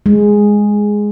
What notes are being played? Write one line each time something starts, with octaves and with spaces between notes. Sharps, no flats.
G#3